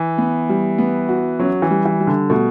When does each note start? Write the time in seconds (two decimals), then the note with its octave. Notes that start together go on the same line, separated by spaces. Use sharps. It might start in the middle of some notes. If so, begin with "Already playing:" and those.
Already playing: E3
0.18 B3
0.49 G3
0.78 B3
1.09 F#4
1.39 F#3 C#4
1.62 E3
1.70 G3
1.85 E3
2.00 G3
2.07 D3
2.30 B2 A3